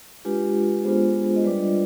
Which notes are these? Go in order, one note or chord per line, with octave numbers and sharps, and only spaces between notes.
G#3 D4 F4 G4 B4
G#3 B3 D4 F4 G#4 C5
D#5
G3 D4 F4 B4 D5